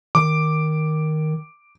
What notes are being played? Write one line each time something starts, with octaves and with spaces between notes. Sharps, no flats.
D#3 D6